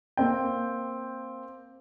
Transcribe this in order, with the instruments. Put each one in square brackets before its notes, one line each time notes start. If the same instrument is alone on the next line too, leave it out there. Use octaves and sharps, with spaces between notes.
[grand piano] A#3 C4 G5